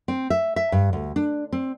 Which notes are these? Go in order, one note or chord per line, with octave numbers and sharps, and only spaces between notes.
C4
E5
E5
G2
D2
D4
C4